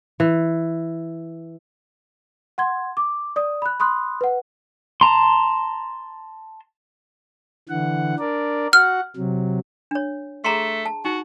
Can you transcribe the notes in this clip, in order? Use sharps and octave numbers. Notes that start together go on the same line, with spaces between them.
E3
F#5 C6 G#6
D6
D5 D#6
B5 F#6
B5 C6 D#6 F#6
B4 F#5
A5 A#5 C6
D3 E3 F#5
D4 A#4 D5
F#4 F#5 F6
C3 F#3
D4 C#5
A3 G#4 A#5 C6
A5
D#4 F#4